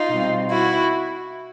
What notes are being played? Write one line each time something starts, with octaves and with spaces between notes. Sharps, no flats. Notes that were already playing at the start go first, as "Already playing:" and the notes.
Already playing: D#4 F4
B2 G3 C4
E4 F#4